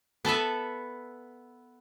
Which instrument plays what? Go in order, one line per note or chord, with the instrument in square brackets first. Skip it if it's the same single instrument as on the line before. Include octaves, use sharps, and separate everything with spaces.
[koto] B3 A4 B4 E5